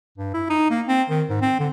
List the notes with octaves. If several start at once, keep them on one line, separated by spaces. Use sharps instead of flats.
G2
E4
D#4
A#3
C4
D#3
G#2
C4
D3